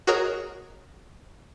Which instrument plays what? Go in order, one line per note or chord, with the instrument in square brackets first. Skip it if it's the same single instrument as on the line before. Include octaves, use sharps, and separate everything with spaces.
[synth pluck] F#4 G#4 A#4 C#5 D#5 A#5